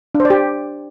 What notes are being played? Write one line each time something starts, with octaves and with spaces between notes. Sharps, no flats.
D4
C5
D5
G4